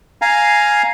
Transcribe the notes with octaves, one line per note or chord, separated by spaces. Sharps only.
F5 G#5 A#5